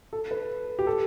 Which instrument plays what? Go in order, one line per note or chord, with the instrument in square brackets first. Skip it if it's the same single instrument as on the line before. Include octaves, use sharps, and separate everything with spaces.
[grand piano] A4
B4
G4
A4